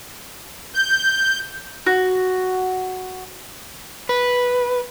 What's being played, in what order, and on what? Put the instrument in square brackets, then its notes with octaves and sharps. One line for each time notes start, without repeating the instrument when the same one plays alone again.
[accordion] G6
[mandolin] F#4
[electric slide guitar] B4